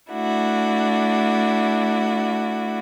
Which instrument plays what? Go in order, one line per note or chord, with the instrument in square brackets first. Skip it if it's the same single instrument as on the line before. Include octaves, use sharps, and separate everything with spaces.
[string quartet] A3 D4 E4 F#4